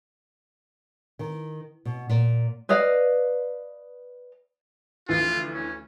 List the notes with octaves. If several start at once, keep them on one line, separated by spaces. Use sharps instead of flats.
D#3
B2
A#2
B4 D5 D#5 F5
D2 E3 F3 F4
C#4